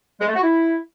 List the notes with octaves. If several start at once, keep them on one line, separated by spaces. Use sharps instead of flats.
G#3
A3
F#4
E4